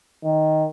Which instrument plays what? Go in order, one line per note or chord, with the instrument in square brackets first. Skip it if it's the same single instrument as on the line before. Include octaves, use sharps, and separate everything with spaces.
[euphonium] D#3